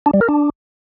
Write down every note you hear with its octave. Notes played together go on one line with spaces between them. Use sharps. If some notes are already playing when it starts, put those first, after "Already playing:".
D4
G3
A#4
D4